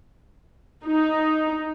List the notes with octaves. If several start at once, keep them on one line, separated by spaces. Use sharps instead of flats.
D#4